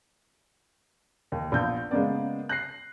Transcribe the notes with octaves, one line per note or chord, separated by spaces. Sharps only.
D#2
A#1 B3 F4 G6
C#3 G#3 A#3 B3 D5
F#6 A#6 C7